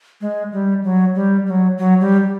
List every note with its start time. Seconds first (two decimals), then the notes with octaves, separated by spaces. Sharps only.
0.21 G#3
0.52 G3
0.83 F#3
1.15 G3
1.46 G3
1.50 F#3
1.78 F#3
2.01 G3